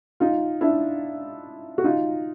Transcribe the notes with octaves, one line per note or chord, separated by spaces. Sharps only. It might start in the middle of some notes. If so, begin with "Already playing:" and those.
D#4 F4
D4 E4
F#4
D#4 F4